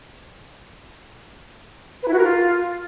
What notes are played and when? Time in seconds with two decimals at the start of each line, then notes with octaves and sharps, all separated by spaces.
2.03 B4
2.08 E4
2.13 F#4
2.18 A#4
2.24 F4